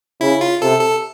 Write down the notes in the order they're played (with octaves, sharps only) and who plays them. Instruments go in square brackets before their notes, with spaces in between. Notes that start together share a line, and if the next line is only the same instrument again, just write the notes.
[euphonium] C#3 [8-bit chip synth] E4
[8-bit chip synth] F4
[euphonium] C3 [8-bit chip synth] A4
[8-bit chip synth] A4